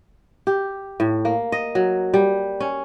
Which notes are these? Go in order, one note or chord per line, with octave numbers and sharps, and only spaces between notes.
G4
A2
A#3
D#5
F#3
G3
C#4